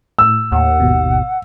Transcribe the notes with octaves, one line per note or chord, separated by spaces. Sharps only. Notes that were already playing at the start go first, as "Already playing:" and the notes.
A2 E6
D#2 F#5
G#1 B2